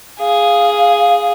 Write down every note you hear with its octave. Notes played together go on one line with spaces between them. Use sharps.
G#4 F5